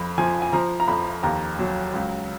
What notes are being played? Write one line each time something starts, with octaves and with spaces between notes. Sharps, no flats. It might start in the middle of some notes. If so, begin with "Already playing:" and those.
Already playing: F2 B5
F3 G#5
G#5
F3 A#5
A#5
F2 B5
D#2 A#5
F#3
C#2